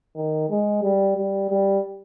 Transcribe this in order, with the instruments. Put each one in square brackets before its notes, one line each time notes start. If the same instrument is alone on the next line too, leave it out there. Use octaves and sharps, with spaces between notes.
[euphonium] D#3
G#3
G3
G3
G3